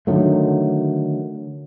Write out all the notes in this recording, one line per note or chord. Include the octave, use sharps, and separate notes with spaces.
D3 D#3 F#3 A3